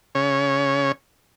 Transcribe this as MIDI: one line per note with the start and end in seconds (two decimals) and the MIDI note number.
0.15 0.92 49
0.15 0.92 73